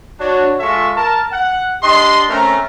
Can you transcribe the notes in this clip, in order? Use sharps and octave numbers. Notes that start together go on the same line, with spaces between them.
D4 F#4 C#5
G#3 F4 A4 E5 C#6
A#4 A5
F#5
D4 G4 D#5 C6
A3 C4 C#4 A#4 E5 A#5